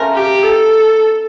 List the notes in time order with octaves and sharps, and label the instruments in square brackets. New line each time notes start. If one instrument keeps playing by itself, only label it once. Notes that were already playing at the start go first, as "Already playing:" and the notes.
Already playing: [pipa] A3 C#4 F4 A#4
[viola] G4
A4